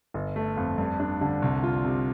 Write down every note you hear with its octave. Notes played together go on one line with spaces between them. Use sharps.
G1
A3
F2
G2
D4
D3
C2
F4
C3